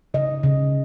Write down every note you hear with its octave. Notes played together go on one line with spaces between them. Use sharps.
C#3 D#5
C#3